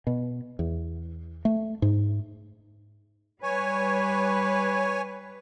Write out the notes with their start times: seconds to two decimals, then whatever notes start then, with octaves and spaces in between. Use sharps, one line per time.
0.07 B2
0.59 E2
1.45 A3
1.82 G#2
3.43 G3 B4 C#5 G#5